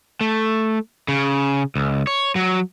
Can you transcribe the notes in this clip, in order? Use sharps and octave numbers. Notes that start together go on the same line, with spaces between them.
A3
C#3
C#2
C#5
F#3